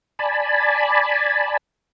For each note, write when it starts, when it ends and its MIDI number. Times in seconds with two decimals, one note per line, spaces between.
0.19 1.57 74
0.19 1.57 80
0.19 1.57 81
0.19 1.57 83